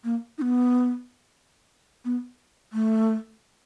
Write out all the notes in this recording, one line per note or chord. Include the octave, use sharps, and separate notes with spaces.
A#3
D#4
B3
B3
A3